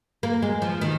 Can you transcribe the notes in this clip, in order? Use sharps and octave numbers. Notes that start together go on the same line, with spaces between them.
A#3
G#3
F3
D#3